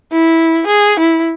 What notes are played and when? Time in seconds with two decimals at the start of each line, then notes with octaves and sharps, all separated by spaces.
0.12 E4
0.67 G#4
0.99 E4